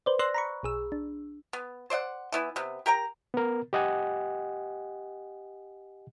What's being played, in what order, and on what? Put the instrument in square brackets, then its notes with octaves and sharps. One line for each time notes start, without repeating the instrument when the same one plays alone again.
[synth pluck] B4 C5 D5
C5 D5 C6 E6 F#6 A#6
A#5 B5 C#6
B1 G#4 E6
D4
[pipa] B3
C5 D5 D#5 F#5
E3 B3 E4
C3 B3
G4 A#4 G5 A#5
[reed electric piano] B3 A#4
G4 D#5 F#5 G#5